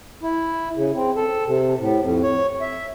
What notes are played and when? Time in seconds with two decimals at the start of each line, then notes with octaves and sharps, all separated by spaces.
0.23 E4
0.76 C#3
0.95 C4
1.16 A4
1.47 C3
1.78 A2
2.01 F2
2.23 C#5
2.61 E5